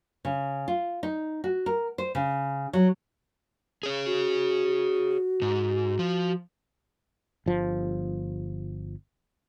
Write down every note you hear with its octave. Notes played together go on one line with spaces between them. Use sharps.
C#3
F4
D#4
F#4
A#4
C5
C#3
F#3
G#4 C#5
F#4
G#2
F3
G1 F3